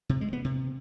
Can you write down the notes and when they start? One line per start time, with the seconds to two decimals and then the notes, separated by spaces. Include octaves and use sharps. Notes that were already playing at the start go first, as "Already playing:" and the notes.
0.09 C3
0.21 G#3
0.33 B3
0.45 C3